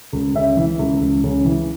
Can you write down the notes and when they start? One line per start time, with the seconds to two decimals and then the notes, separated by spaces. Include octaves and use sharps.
0.13 C#2
0.34 C#3 E5
0.57 E3
0.79 C#2
1.01 C#2
1.24 C#3
1.45 E3